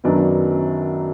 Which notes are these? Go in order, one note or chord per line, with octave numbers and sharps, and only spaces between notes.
F#2 D#3 F#3 B3 D4